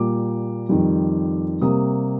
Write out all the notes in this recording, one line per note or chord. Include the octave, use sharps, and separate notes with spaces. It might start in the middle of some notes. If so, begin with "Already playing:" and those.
Already playing: A#2 G3 A#3 D6
F2 D#3 G3
C3 G3 A#3 D#6